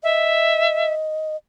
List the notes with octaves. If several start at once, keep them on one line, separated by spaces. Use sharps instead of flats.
D#5 E5